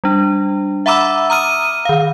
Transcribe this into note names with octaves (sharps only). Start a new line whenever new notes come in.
G3 D4
E5 F#5 A#5 B5 D6 E6
A#5 D#6 F6 D#7
D#3 F5